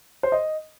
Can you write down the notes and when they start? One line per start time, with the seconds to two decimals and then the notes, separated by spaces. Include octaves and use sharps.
0.23 C5
0.32 D#5